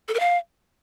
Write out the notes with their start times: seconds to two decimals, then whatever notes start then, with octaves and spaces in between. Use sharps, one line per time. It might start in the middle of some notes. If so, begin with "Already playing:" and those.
0.08 A4
0.14 A#4
0.20 F5